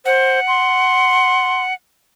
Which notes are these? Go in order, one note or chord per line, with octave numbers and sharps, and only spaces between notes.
C5 F#5
C6